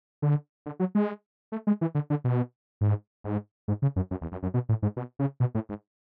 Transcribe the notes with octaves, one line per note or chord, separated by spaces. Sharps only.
D3
D3
F#3
G#3
A3
G#3
E3
D3
D3
B2
G#2
G#2
G#2
C#3
F#2
F#2
E2
F#2
F#2
B2
A2
G#2
B2
C#3
B2
A2
G#2